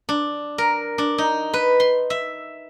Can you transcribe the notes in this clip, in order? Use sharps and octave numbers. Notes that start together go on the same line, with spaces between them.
D4
A#4
D4
D#4
B4
C6
E5